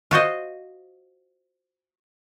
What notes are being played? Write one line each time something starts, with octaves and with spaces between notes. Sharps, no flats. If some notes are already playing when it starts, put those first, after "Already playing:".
F4 F#4 C5 D#5